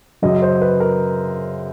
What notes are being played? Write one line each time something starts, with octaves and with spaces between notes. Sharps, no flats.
F#2 C#3 F#3 D#5
C5
B4
A#4